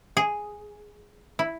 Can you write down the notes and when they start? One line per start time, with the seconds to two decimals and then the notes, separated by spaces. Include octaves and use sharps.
0.17 G#4
1.39 E4